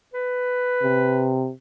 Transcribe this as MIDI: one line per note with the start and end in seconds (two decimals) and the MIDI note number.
0.14 1.39 71
0.83 1.51 48